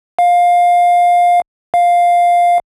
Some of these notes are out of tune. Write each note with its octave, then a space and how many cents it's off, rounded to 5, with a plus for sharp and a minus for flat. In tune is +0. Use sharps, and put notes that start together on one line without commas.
F5 +15
F5 +5